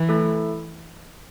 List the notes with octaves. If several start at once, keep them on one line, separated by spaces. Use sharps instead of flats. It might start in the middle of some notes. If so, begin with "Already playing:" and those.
Already playing: E3
A3 E4 A4